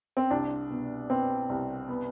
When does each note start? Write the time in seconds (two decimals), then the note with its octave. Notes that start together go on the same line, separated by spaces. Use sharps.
0.17 C4
0.30 C2 D4
0.70 B2
1.10 B3 C4
1.49 C2
1.89 B3